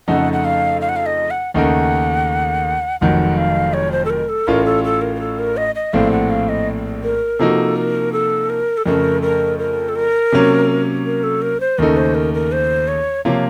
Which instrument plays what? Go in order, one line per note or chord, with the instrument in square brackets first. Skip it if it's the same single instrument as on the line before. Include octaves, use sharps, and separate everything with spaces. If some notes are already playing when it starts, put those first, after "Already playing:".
[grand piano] F2 C#3 A3 D#4 A4 [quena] F#5
[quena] F#5
F5
F5
F#5
F5
D#5
F#5
[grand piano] D#2 C#3 A3 D#4 A#4 [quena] F#5
[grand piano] F1 F2 D#3 F#3 [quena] F#5
[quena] F5
C#5
C5
A4
A#4
A4
[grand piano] A1 A2 A3 C#4 F4 [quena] A#4
[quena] A4
A4
A#4
A#4
A4
A#4
D#5
D#5
[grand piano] A#1 A2 A3 C4 [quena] F5
[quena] F#5
F5
D#5
A#4
[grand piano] C3 F3 A#3 D#4 F#4 [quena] A4
[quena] A#4
A4
A#4
A4
[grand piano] F2 C#3 A3 [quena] A#4
[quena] A#4
A#4
A4
A#4
[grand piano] C3 F#3 A#3 C#4
[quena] A#4
A4
A#4
C5
[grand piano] D#2 C#3 A3 D#4 A4 [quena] A#4
[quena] C5
A#4
A#4
C5
C#5
[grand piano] C3 F3 A#3 F4 [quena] C#5